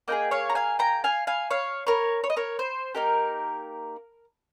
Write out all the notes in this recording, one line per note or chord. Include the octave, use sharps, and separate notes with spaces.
A#3 D#4 G#4 D#5 G5
C#5 F5
A#5
F5 G#5
G5 A#5
F5 G#5
F5 G#5
C#5 F5
A#4 C#5
C#5
D#5
A#4 C#5
C5
A#3 D#4 G4 A#4